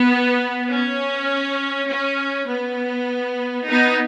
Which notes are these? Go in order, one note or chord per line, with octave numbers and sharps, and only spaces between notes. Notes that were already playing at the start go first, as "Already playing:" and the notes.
Already playing: B3
C#4
C#4
B3
B3 D#4